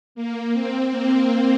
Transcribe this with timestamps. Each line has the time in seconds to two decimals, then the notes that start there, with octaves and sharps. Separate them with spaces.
0.15 A#3
0.53 C4
0.91 A#3